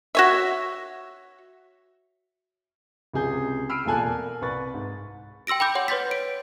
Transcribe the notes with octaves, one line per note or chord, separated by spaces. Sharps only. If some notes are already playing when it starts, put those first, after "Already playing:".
F#4 C#5 E5
C#2 C3 G#4 G6
B5 E6 F6 C7 D7 D#7
E1 C2 A#2 A4 G#5 F#6
A#4
C2 B4 C#6 A6
G#2
G5 C6 E6 A#6 D7
G5 B5 D6 G6
C#5 F#5 C6
B4 C#5 C6 G6 A6 B6
D7